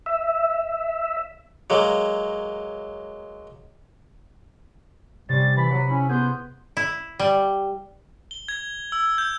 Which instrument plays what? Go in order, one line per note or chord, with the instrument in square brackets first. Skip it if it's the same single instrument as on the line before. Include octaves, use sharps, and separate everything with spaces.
[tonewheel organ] E5
[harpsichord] F#3 G#3 A#3
[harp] C3 C#4 D4 [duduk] G3 [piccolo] A6
[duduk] E3 [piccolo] B5
[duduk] F#3 [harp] F#5 D#6
[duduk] C#4 [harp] E4
[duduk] B3 [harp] G#4 C6 [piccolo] G6
[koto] E4
G3
[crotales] G7
G#6
E6
G6